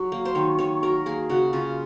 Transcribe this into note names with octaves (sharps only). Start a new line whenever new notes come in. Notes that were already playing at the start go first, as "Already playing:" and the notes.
Already playing: F#3
A#3
C5
D#3 C#5
D#3 C#5
F#3 A#4
A#3 G#4
C#3 F#4
C#3 F4